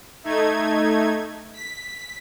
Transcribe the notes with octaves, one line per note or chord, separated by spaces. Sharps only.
A3 D#4 G#6
B6